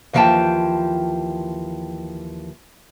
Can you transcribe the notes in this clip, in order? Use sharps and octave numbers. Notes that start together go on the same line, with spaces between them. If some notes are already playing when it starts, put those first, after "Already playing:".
D#2 E3 F3 F5 G5 A5